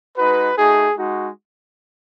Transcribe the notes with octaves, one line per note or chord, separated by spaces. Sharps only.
G#3 D#4 F#4 B4
A3 D#4 F#4 G#4
G#3 D#4 F#4